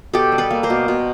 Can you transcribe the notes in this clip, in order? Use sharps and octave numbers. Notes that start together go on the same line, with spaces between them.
B2 G4 A4
G3
A4 B4
A#3
A#4 C5
B2
B2